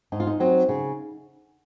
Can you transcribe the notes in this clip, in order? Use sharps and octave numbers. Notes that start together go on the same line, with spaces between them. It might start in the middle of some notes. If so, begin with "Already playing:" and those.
G#2 D#4
F4
D#4
F#3 C4
C#3